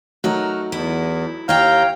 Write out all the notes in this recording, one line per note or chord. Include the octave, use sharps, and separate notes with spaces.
F#3 A3 D#4 F#4 A#4 C#5
E2 E4
D#2 C#5 F5 G5 A#5 G6